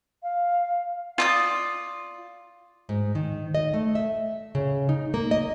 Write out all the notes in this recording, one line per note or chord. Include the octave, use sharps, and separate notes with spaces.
F5
F4 D5 D#6
G#2
D#3
D#5
A3
E5
C#3
D#4
A#3
D#5